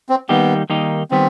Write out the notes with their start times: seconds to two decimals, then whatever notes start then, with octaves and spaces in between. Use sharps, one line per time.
0.09 C4
0.29 D#3 G3 A#3 B3 D#4 G4
0.70 D#3 G3 A#3 D#4 G4
1.11 D#3 G3 B3 C4